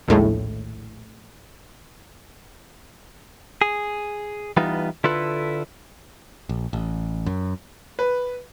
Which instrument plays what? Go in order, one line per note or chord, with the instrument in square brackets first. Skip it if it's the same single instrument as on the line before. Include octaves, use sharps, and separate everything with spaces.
[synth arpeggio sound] A#1 D#2 A2 G#3 A3
[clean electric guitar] G#4
E3 G3 B3 D#4 F4
D3 E4 F4 A4 B4
[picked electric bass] A#1
A1
F#2
[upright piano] B4